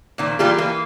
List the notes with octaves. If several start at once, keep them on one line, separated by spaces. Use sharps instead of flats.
A#2 D#3 F3
E3 G3 A#3 F4 G4 G#4
E3 A#3